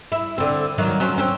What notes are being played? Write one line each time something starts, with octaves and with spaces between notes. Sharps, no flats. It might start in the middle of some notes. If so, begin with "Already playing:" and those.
E4
D3 C4
D#3 F#3 F4
F#3 C4 C#4
C4 C#4